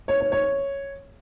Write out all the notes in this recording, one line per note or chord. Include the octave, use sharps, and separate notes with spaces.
C#5
C#5
C#5